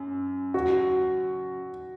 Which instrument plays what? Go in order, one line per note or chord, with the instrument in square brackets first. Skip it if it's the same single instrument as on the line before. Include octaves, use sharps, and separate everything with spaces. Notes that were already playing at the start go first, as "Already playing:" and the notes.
Already playing: [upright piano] F#2
[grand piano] F#4